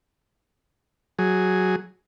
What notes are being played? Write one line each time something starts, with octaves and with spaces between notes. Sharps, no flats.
F#3 G#4